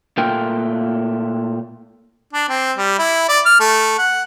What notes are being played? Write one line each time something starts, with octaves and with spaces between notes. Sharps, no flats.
A#2 A3 A#3 F4 A#4 G5
D4
C4
G3
E4
D5
F6
A3
F#5